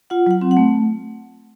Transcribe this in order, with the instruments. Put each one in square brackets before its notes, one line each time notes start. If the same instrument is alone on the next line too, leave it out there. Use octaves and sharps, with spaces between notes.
[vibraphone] F4 F#5
F#3 F#5
C4
F#5
A3